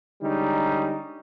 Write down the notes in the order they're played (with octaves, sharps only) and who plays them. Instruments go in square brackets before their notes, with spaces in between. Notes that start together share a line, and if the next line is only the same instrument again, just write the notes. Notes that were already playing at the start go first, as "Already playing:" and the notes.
[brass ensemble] D3 G3 G#3 C#4 D#4